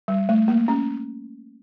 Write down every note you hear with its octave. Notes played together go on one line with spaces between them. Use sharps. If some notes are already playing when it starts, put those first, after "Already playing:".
G3
A3
A#3
C#4